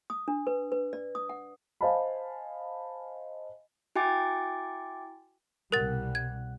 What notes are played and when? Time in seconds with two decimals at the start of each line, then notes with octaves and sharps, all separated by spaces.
0.10 D#6
0.28 D4
0.47 B4
0.72 B4
0.93 D5
1.15 D#6
1.29 F#5
1.81 C5 D#5 F5 G#5 A5 B5
3.96 E4 F#4 G5 G#5 D6 A6
5.72 C2 B2 G3 A#4 F#5 F#6 A6
6.15 G#6